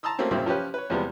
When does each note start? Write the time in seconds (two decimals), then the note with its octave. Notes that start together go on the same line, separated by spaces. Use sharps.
0.03 A5 A#5 C6 D#6 E6
0.18 F#3 A3 A#3 C4 C#4
0.31 G2 A#2 C#3 F#3 C4 E4
0.46 F3 C#4 G4 B4
0.74 B4 C#5
0.90 E2 C3 F3 G3 G#3 B3